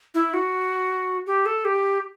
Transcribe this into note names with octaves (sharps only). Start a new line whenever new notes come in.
E4
F#4
G4
A4
G4